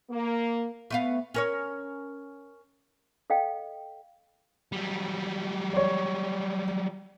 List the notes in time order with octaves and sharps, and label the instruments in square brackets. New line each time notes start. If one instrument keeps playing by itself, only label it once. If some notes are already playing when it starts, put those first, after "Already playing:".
[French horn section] A#3
[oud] A3 B3 F5
C#4 A#4 C#5
[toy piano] A4 D#5 F5 G5
[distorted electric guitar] F#3 G3
[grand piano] C#5 D5